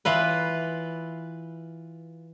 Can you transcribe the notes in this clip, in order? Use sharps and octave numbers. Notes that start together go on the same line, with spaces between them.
E3 F4 B4